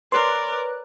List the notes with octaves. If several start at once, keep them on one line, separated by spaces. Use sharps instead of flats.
A#4 B4 C#5 D5 C6 F#6